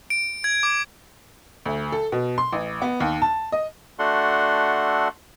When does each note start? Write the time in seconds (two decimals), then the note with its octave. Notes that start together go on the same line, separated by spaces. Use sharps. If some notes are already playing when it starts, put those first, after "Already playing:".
0.10 D7
0.44 G#6
0.63 D6
1.66 D2
1.92 A4
2.12 B2
2.38 C6
2.53 A1
2.82 B3
3.00 D#2
3.22 A5
3.52 D#5
3.99 A3 D4 F#4 A4 F#5 C6